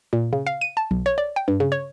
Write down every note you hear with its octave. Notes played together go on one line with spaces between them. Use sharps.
A#2
C#3
F5
D#7
A5
B1
C#5
D5
G5
G2
C#3
C#5